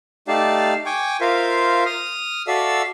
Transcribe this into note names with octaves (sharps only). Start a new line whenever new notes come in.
A3 D#4 G4 D5 F5 A5
G5 G#5 C#6 D6
F4 A#4 C5 E5 F5
D#6 F6
F#4 A4 D5 E5 F5 E6